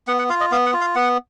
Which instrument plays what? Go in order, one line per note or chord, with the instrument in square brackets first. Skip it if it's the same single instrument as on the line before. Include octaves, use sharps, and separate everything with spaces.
[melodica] B3 F#5
F#5
F4 F5
D#5
B3 F5
F#5
F4
F5
B3 F#5